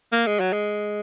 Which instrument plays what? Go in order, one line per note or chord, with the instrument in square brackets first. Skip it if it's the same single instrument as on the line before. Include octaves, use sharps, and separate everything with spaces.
[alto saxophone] A#3
G#3
F#3
G#3